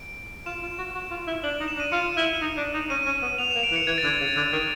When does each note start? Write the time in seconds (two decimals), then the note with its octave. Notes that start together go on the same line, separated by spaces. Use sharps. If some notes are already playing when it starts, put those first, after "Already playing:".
Already playing: D7
0.46 F4 E7
0.62 F4
0.78 F#4
0.95 F#4
1.11 F4
1.27 E4
1.43 D4 F#7
1.55 D#4 F#7
1.68 E7
1.77 D4
1.80 D#7
1.92 F4 C#7
2.17 E4
2.41 D#4
2.57 D4
2.74 D#4
2.90 C#4 D#7
3.06 C#4
3.22 B3
3.38 B3 F7
3.51 A#3 E7
3.63 D7
3.71 E3
3.76 C#7
3.87 E3 G#6
3.98 A6
4.04 D3
4.07 G#6
4.20 C#3
4.36 D3 G#6
4.53 D#3